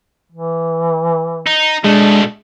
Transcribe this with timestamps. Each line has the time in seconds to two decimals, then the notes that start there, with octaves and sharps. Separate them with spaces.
0.32 E3
1.46 D#4
1.84 B2 G#3 A3 D4